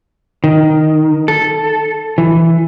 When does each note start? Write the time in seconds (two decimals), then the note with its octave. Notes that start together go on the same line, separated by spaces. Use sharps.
0.44 D#3
1.28 A4
2.18 E3